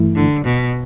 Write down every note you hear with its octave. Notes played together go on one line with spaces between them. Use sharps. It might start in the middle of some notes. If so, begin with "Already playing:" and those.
Already playing: G2 E3 A3 E4
D3
B2